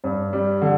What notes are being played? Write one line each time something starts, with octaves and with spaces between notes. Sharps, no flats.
G2
G3
D3